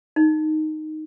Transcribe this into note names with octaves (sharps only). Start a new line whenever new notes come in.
D#4